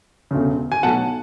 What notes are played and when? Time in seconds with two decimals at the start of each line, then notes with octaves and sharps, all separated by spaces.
0.31 E1 D2 C#3
0.72 G#5
0.83 B1 B2 F#3 A3 F#5 A5